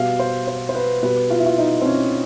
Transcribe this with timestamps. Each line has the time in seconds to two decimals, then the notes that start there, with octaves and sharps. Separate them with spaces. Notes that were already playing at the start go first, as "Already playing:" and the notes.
Already playing: B2 G3 F5
0.19 C5
0.47 C5
0.69 C5
0.75 B4
1.03 B2 G3 B4
1.30 F4
1.39 E4
1.46 F4
1.58 D#4
1.81 C4
1.85 C#4